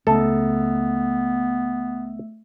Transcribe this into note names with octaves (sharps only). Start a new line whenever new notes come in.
C#2 C#3 A3 B3 C#4 A4 E5 E6